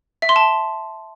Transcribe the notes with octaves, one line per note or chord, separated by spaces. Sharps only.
E5
C6
A5